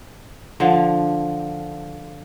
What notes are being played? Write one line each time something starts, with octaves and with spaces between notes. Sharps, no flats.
D3 F3